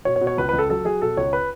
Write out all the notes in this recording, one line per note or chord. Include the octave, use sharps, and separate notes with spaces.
B2 C#5
C#5
B2
C#5
C#2 B4
C#2 B4
A4
F#3 A4
F#3 G#4
B2 A4
C#2 C#5
B4